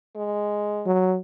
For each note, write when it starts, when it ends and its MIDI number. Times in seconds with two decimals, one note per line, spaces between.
0.16 0.87 56
0.86 1.18 54